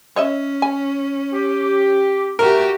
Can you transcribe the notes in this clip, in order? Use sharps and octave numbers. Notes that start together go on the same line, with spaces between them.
C#4 C#5 D#5 E5
G#5
G4
A3 F#4 G4 A#4